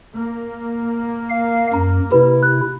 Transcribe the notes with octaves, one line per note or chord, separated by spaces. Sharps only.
A#3
F5
F#2 A#5
C3 E4 B4
F#6